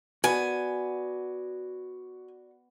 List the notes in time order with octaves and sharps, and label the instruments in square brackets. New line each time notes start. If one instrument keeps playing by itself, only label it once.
[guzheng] B3 [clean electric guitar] F#4 D5 [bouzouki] G#5